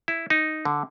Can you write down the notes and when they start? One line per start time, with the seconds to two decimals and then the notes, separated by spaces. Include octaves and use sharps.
0.08 E4
0.30 D#4
0.65 D3